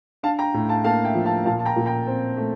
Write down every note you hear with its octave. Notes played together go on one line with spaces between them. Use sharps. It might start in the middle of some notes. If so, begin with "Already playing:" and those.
D4 F5 A5
G5 A#5
A2
F5 A5
A#3 F5 A5
E5 G5
F3
F5 A5
A#2 F5 A5
A5
G5 A#5
A#2
G5 A#5
C4
A3